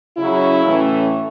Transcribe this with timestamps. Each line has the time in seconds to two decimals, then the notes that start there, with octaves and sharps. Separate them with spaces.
0.16 C#3 F#3 C#4 E4
0.64 A2 E3 A3 C#4